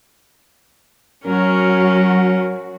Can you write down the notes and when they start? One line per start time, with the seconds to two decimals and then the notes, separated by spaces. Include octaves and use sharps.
1.25 F#3 C#4 F#4 A#4